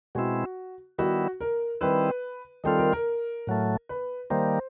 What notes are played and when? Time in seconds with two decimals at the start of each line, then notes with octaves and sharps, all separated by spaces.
0.15 B2 G#3 C4 E4 F#4
0.99 D#3 G3 B3 E4 F#4
1.41 A#4
1.81 D#3 G3 C4 E4 B4
2.64 D#3 G3 C4 F4 A4
2.78 A#4
2.92 A#4
3.47 A2 F#3 A3
3.89 B4
4.30 D#3 G3 A#3 C5